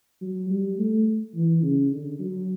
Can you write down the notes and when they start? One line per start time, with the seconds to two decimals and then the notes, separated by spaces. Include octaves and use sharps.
0.21 F#3
0.50 G3
0.79 A3
1.35 E3
1.62 C#3
1.91 D3
2.20 F#3